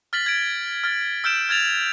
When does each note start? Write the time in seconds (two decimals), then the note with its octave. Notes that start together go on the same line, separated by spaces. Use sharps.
0.13 F6 A6 B6 F#7
0.26 G#6 D7
0.84 F6 A6
1.24 E6 F6 G6 D7 E7
1.49 F6 G#6 A6 F7